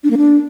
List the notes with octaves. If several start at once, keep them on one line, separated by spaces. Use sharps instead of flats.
D4
A#3
D4